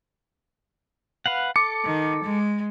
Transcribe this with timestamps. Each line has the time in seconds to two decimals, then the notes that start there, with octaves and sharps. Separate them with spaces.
1.26 B4 F5 F#5
1.56 A4 D6 C#7
1.85 D#3
2.24 G#3